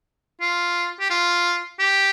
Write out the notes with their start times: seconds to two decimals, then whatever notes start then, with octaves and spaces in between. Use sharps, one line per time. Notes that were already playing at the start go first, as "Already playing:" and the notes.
0.41 F4
1.00 G4
1.10 F4
1.79 G4